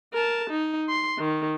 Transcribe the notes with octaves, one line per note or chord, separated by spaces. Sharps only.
A#4 A5
D#4
C6
D#3